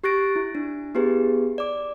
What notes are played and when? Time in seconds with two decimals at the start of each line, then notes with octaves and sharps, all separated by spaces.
0.04 G4 C#6 F#6 A6 A#6 D7
0.36 E4
0.55 D4
0.95 B3 E4 G4 G#4 B4
1.58 D5 D6